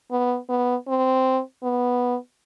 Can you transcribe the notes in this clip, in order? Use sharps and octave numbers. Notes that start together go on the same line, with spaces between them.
B3
B3
C4
B3